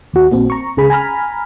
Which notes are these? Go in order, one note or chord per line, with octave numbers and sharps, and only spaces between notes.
D#2 F#4
A#1 A#3 C4
A#5 C#6
C#2 C#3 G#4 B5
G#5 A#5 B5 F6